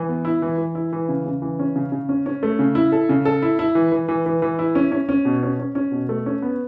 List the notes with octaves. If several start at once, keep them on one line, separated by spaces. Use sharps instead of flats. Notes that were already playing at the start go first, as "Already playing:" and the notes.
Already playing: E3
B3
E4
E3
E3
E4
E3
C#3
C#3
E3
C#4
C#3
C#3
C#4
C#4
A3
C#3
E4
A4
C#3
A4
E4
E4
E3
E3
E3
E3
E3
E4
C#4
C#4
C#4
B2
C#4
C#4
C#4
B2
A3
C#4
B3